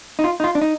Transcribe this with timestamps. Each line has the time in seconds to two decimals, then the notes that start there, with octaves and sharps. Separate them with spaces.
0.19 D#4
0.24 F4
0.40 D#4
0.44 F4
0.55 D4
0.62 D#4